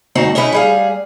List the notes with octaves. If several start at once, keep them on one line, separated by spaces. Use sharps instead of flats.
D2 G2 C4 D#4 F#4
C#4 D#4 E4 G#4 B4
G3 G#4 F5